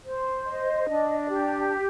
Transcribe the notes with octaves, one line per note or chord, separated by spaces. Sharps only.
C5
D#5
D4
G4